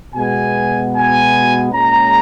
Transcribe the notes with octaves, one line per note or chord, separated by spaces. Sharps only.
B2 G#3 B3 G#5
G#5
A#2 G#3 C#4 A#5